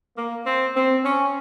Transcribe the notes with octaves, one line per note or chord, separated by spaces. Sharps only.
A#3
C4
C4
C#4